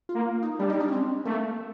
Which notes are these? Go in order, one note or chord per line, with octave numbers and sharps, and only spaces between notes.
F4
A#3
D#4
G3 D4
D#4
D4
C#4
C4
A3 A#3